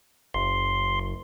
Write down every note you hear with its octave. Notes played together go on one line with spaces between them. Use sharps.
F#1 C6